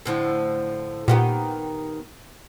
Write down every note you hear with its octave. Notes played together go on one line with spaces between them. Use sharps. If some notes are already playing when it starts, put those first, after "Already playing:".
A2 D3 F3
A#2 D#3 B3 G4